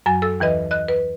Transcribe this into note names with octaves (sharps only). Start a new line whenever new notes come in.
F#2 F#3 G#5
A4 E6
D#2 E3 B4 D#5
D#5 F#6
B4